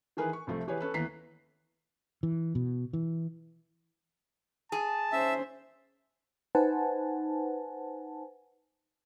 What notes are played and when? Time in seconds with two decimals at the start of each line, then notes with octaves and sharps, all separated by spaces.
0.17 D#3 E3 G#4 A#4 B4
0.33 C#6
0.47 C2 C3 F3 A3
0.67 E3 G4 G#4 B4 C#5
0.80 C#4 A4 B4
0.94 D#2 E3 B3 A#5 B6 C7
2.23 E3
2.55 B2
2.93 E3
4.72 G#4 A5
5.12 C#4 C5 E5
6.55 D#4 B4 C5 F#5 G#5 A5